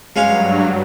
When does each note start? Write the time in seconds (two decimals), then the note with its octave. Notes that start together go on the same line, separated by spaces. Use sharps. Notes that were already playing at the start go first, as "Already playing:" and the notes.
0.16 G2 F#3 G#3 C#4 F5